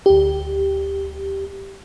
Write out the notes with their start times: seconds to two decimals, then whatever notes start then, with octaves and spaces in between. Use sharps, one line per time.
0.06 D2 G4